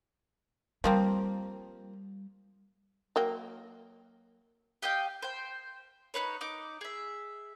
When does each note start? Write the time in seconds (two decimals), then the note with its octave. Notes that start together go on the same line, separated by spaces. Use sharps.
0.84 F3 G3 A#3 C4
3.16 F#3 A#3 G5
4.82 G4 D#5 F5 G5
5.22 C5 G5
6.14 D#4 F4 B4 C#5
6.41 D#4 D6
6.81 G#4 E5